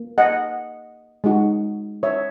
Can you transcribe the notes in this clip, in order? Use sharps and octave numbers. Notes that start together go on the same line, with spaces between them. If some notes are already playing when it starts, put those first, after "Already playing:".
Already playing: A#3
D#5 F#5
G#3 D#4 F#4
C#5 E5